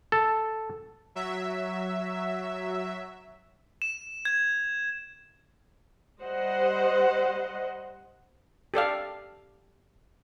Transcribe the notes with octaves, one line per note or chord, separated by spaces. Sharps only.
A4
F#3 E5
E7
G#6
G3 C5 D#5 F#5
G4 A4 D5 F5